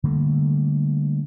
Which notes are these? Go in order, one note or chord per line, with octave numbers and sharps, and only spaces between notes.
D3 G3 A3 A#3